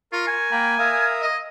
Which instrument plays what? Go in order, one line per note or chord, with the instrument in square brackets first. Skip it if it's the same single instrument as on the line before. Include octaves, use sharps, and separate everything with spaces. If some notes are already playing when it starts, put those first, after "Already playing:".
[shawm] F4 [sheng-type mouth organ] A#4 C#6
[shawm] G#5
[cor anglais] A#3 [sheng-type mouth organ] G5 A#5 B5
[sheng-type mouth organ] A#4 E5 D#6 [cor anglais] F5
[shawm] D#5